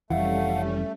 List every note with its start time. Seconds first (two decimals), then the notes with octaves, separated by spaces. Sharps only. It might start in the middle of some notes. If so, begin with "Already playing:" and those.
0.10 F1 F2 E3 G3 A3 C#4 F5 F#5